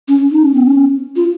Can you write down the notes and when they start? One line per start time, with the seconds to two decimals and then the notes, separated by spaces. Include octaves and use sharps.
0.08 C#4
0.31 D#4
0.43 C#4
0.54 B3
0.67 C#4
1.16 F4